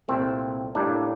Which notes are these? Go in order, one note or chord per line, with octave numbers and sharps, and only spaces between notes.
C2 A#2 A3 C4
A2 G3 A#3 D4